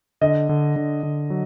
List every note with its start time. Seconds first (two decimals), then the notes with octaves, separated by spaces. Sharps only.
0.21 D3 D#5
0.49 D3
0.76 D3
1.03 D3
1.30 F#3